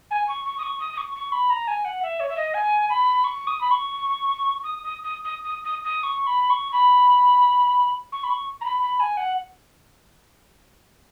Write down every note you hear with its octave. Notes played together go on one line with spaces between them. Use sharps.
G#5
C#6
C#6
D#6
C#6
D#6
D#6
C#6
C#6
B5
A#5
G#5
F#5
E5
C#5
E5
D#5
G#5
B5
C#6
D#6
B5
C#6
D#6
D#6
D#6
D#6
D#6
D#6
D#6
C#6
B5
C#6
B5
C#6
B5
C#6
A#5
B5
B5
G#5
F#5